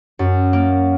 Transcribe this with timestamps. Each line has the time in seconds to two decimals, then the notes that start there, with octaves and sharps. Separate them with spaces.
0.19 F#2
0.53 A#3